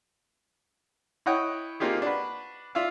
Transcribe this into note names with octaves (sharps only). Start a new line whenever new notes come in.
E4 C#5 D#5 F#5 G5
A#3 C4 D#4 F4 G4 G#4
D4 F#4 B4
F4 D5 E5 F5